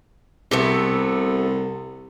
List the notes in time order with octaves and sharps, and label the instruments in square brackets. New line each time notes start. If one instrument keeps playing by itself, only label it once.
[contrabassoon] C2 [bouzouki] C3 A3 B3